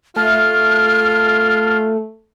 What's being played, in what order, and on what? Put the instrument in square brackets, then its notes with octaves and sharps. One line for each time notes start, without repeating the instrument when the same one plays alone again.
[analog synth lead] A3 [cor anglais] F4 [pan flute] F6